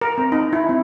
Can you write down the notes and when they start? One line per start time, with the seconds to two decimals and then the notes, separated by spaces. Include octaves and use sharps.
0.01 A#4
0.18 C4
0.32 D#4
0.53 E4
0.69 C4